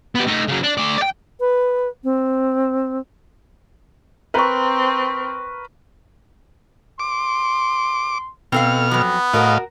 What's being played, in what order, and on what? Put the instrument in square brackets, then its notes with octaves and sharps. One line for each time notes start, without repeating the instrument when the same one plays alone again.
[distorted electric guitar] B3 G4
A3 D#4
C#3 F#3
D4
A3 D5
D5 G5
[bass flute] B4
C4
[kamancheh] C4 [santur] A#4 C#6 [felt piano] B4
[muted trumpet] C6 [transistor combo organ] D6
[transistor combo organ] B2 F6 [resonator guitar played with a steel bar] C4 A4 F5
[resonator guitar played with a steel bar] F2 F#3 [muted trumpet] B3
[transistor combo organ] A2 D#5 F5 [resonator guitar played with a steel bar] F#4 A#4